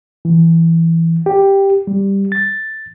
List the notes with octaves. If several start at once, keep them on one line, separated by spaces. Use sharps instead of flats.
E3
G4
G3
A6